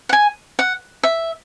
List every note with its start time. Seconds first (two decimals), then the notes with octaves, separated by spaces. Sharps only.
0.09 F#5
0.13 G#5
0.59 F#5
1.03 E5